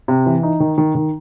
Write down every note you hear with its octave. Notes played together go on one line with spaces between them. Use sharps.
C3
E3
D#4
D#3
D#3
D#3